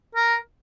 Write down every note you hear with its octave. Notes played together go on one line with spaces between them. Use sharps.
A#4